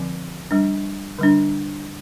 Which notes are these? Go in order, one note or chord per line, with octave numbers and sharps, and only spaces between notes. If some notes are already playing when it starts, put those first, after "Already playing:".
Already playing: D3 F3 C4
G3 D4
D3 G3 D4